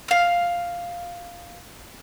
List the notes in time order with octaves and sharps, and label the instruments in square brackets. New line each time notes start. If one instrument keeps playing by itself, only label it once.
[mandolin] F5 F6